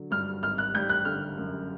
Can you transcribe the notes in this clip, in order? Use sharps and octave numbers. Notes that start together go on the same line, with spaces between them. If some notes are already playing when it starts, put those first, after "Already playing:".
Already playing: D3 F#3
G2 F6
G#1 F6
F#6
G3 G6
F#6
D3 F6
F#2